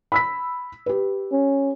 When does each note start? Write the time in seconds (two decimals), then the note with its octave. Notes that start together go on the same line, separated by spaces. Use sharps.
0.12 B5 E6 B6
0.86 G4 B4
1.32 C#4